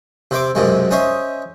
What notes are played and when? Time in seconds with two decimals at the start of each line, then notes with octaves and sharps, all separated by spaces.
0.31 C3 C5 E5 D6
0.55 B1 F#2 C3 G#3
0.91 C#4 C5 D#5 E5